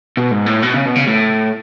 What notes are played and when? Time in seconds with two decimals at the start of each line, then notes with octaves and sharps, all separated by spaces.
0.17 B2
0.31 G#2
0.46 A2
0.63 B2
0.74 C#3
0.86 B2
0.96 C#3
1.07 A2